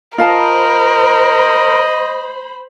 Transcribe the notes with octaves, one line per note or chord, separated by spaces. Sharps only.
F4 A#4 C5 D#5 F5 A5 B5